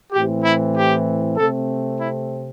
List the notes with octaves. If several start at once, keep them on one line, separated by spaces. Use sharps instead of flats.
A2 E3 C4 G4
E4
G4
C3 A3 C4 A4
E4